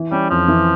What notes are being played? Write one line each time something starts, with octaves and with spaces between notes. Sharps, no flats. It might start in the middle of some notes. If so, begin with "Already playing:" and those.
Already playing: E3
G3 C#4
F2 F3
E3